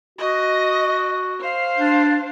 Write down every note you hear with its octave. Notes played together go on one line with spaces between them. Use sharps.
F#4 D#5
C5 F5
D4